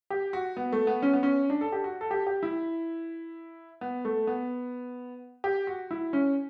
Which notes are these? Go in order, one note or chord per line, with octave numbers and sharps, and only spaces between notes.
G4
F#4
B3
A3
B3
C#4
B3
C#4
D4
A4
G4
F#4
A4
G4
G4
E4
B3
A3
B3
G4
F#4
E4
C#4